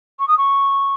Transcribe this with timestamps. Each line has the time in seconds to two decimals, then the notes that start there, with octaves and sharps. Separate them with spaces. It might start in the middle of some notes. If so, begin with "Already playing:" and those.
0.19 C#6
0.27 D#6
0.37 C#6